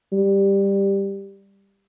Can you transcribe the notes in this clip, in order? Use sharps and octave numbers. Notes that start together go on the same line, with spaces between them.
G3